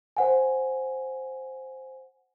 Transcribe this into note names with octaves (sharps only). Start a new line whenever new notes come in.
C5 F#5 G#5